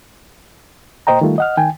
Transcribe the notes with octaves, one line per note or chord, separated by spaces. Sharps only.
A#2 C5 D#5 G5 A#5
D#3 G3 A3 F4
D#5 F#5 F6
D#3 G5 G#5